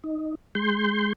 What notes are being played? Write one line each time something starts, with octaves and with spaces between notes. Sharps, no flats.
D#4
G#3 C6 G6